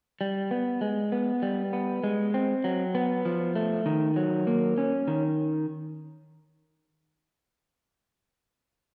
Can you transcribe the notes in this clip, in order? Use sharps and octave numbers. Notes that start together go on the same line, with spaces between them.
G3
B3
G#3
B3
G3
B3
G#3
C4
F#3
B3
F3
A3
D#3
F#3
A#3
C#4
D#3